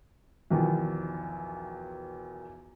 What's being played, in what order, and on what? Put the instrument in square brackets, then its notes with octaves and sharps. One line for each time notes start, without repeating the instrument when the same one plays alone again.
[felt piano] B1 E2 D#3 F3